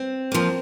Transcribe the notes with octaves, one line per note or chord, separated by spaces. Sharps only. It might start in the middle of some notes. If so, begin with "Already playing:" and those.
Already playing: C4
F2 F3 A#3